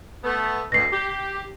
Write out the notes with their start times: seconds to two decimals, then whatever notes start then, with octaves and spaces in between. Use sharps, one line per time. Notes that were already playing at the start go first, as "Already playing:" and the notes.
0.24 A3 B3
0.72 D2 B2 A#6 C7
0.91 G4